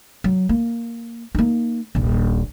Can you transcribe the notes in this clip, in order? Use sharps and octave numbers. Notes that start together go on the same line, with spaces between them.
F#3
A#3
A#3 D#4
D#1 A#1